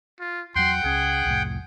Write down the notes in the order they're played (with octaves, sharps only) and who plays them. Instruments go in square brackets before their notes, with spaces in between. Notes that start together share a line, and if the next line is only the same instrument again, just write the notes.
[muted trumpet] F4
[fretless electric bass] E2 F#3 [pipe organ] F#5 G5 [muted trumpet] C6
[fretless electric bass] C#2 C#4 [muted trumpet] G#4
[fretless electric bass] C2 F2 A2